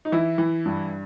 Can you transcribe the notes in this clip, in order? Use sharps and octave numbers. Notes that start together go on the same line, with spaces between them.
D#4
E3 E4
E3
G2